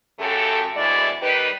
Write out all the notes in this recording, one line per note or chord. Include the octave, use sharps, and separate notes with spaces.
F#2 C#3 A3 G4 A4
D2 B2 E3 G#3 E4 D5
D#3 G3 D#4 G4 B4